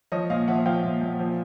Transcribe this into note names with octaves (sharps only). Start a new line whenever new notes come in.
F3 C#5 D#5
A#2 D#5 F5
F3 E5 F#5
F3 F5 G5
A#2
A#2
F3